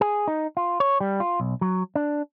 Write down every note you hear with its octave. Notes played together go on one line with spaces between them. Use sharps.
G#4
D#4
F4
C#5
G3
F4
B1
F#3
D4